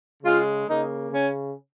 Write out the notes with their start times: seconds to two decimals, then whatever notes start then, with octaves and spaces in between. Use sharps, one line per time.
0.23 C#3 G#3 F4
0.67 C#3 A#3 D#4
1.11 C#3 C#4